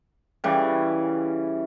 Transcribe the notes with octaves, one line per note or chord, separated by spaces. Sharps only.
C#3 E3 G3